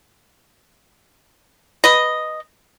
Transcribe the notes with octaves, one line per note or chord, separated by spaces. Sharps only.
B4 D#5